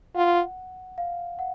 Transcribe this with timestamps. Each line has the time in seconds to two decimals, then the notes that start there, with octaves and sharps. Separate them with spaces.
0.16 F4 F#5
0.98 F5
1.39 F#5